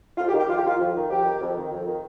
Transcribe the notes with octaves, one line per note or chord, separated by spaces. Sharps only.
F2 F4
G4
D#3
G4
F2 F4
G4
D#3 F4
F2
D#3
F2 G4
D#3
F2
D#3
F2
D#3